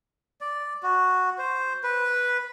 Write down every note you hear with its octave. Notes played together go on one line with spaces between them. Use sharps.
D5
F#4
C5
B4